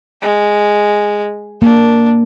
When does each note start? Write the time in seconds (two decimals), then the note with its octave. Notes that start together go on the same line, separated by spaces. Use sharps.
0.22 G#3
1.62 A#3 D4